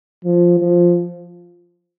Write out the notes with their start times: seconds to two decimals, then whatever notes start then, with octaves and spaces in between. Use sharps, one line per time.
0.25 F3
0.60 F3